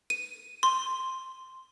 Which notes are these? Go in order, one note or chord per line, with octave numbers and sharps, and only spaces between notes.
D#7
C6